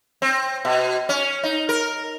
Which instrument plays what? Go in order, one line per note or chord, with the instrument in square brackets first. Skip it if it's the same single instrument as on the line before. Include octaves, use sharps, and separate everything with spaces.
[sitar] C4
B2
C#4
D#4
A#4